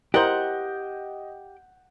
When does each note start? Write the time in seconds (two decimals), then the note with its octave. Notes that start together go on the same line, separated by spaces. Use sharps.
0.14 E4 G4 A#4 C5 D#5 F#5 G6